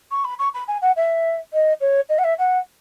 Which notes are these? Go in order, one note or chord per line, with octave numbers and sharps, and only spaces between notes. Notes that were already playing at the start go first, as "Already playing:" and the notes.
C#6
B5
C#6
B5
G#5
F#5
E5
D#5
C#5
D#5
F#5
E5
F#5